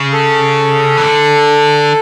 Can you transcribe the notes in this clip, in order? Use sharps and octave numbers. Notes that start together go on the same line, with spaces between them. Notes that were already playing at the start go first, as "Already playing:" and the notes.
Already playing: C#3
A4
E3
D3